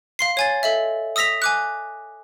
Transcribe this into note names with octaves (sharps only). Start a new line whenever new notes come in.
F5 C6 C7
C#5 G#5 A6
A4 D#5 E5
D#6 E6 A#6 B6 F7
G#5 D6 F#6